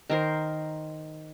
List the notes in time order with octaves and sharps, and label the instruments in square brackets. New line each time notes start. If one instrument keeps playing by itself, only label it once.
[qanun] D#3 A#4 C5